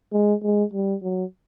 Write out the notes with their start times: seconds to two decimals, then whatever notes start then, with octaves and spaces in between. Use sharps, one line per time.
0.12 G#3
0.43 G#3
0.73 G3
1.03 F#3